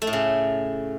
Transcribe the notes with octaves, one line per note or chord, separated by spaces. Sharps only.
A3
A2
C#3